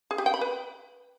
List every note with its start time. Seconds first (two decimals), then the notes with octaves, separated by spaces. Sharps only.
0.11 G#4
0.18 G4
0.26 G5
0.34 B5
0.41 B4